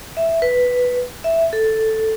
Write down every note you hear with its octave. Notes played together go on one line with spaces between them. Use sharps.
E5
B4
E5
A4